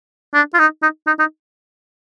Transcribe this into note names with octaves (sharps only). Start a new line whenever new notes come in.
D4
F4
D#4
D#4
D#4
D#4